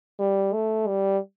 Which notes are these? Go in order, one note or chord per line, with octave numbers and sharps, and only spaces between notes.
G3
A3
G3